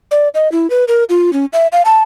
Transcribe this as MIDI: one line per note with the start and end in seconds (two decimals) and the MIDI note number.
0.11 0.28 74
0.34 0.51 75
0.52 0.69 64
0.70 0.84 71
0.88 1.04 70
1.09 1.33 65
1.33 1.45 61
1.53 1.67 76
1.72 1.82 77
1.85 2.03 81